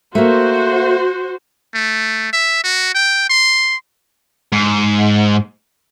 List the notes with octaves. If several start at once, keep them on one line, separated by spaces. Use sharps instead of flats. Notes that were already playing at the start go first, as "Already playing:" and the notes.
A3 A#3 F#4 C5
A3
E5
F#4
G5
C6
G#2